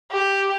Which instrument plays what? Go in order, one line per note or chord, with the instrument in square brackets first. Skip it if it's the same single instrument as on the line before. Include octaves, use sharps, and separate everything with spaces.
[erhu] G4